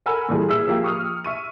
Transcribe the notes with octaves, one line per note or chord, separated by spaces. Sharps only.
A4 A#4 F#5 G#5 B5 E6
A#2 E3 G3 G#4 A4
G#4 E5 E6
F3 A#3 G4
C#6 D#6 F6
E5 C#6 D#7